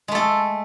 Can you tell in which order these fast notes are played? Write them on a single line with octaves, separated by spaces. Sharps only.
G#3 A3 A4